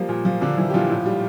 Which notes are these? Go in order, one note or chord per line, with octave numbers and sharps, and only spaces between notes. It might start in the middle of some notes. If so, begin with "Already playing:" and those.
Already playing: F3 G3 A#3
A#2
F3
A#2 D3 D4
E3 F3 E4
G4
A#2 F3 F4
A2
G3